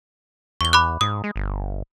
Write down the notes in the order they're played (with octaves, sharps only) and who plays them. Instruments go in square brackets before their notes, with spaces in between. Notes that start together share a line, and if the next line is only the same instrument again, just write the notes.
[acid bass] E2 [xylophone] C#6 G7
[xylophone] B5 D6 F#6
[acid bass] G#2 [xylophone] D#6
[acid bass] G#3
G1